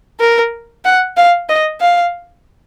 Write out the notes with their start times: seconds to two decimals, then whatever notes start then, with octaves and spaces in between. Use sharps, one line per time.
0.20 A#4
0.85 F#5
1.17 F5
1.49 D#5
1.81 F5